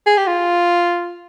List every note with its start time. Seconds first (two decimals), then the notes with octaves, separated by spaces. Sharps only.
0.07 G#4
0.17 G4
0.28 F4